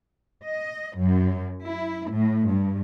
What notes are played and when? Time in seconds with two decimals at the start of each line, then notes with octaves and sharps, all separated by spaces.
0.45 D#5
0.98 F#2
1.64 E4
2.10 A2
2.49 G2